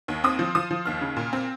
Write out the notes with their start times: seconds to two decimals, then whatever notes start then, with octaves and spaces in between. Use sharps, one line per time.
0.08 D#2
0.24 C4 D#6
0.39 F3
0.55 F3 D#6
0.71 F3
0.86 D#2 F6
1.01 C#3
1.17 A#2
1.33 C4